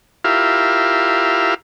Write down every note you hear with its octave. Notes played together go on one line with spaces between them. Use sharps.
E4 F4 G4 A#4 E5 F5